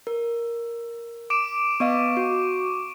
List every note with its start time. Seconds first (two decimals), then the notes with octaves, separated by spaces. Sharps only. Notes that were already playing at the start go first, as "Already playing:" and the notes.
0.07 A#4
1.30 D6 D7 E7
1.80 B3 D#5 F5 C#6
2.17 F#4